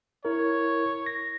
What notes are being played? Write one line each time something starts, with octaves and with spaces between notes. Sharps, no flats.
E4 A#4 C#5
A#6